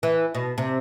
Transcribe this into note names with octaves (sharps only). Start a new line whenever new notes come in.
E3
B2
C3